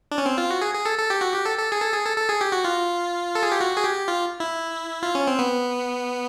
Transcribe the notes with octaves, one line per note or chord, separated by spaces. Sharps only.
D4
C#4
C4
F4
F#4
G#4
G#4
A4
A4
G4
F#4
G4
A4
A4
G#4
A4
G#4
A4
A4
G#4
G4
F#4
F4
A4
G#4
G4
F#4
G#4
G4
F4
E4
F4
C#4
C4
B3